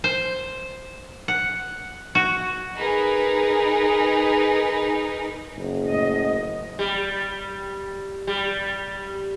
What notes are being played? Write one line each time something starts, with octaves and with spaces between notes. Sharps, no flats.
C5
F#5
F#4
D#4 G#4 A#4 B4
F#1
A2 D#5
G3
G3